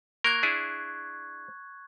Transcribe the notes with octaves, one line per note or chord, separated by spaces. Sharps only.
A#3 A#4 C#6 F#6 G#6
D4 E4 G#4